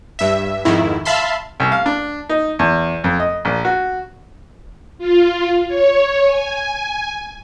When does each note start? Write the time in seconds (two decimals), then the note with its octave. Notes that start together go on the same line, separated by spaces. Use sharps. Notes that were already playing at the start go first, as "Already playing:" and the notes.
0.19 G2 E5
0.65 F2 G#2 D#3 E4
1.05 E5 F5 A5 B5 C6
1.60 C2
1.72 F5
1.86 D4
2.29 D#4
2.59 E2
3.04 F2
3.20 D#5
3.45 A#1
3.65 F#4
4.98 F4
5.68 C#5
6.25 G#5